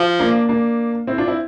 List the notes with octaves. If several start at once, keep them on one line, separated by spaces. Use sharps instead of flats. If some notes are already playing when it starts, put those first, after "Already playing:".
Already playing: F3
A#3 D4
A#3 D4
C4 E4
D4 F4
C4 E4